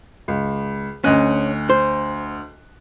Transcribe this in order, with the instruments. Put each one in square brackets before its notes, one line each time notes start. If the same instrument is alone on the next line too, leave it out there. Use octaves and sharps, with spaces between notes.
[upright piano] C#2
[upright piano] D2 D#5 F#6 [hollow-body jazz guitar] C#4
[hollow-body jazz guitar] C5